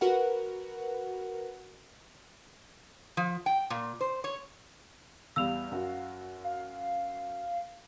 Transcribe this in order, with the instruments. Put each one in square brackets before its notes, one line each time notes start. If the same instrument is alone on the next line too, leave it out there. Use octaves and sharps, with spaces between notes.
[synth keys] F#4 A#4 B4 F#5
[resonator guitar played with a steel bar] F3
G5
A#2
C5
C#5
[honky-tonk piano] E2 G3 [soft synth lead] F5 [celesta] E6 F7
[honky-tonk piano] F#2 F#4
[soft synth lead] F5